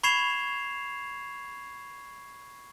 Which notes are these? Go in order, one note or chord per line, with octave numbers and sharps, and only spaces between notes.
B5 C#6 G#6 C7 E7 F7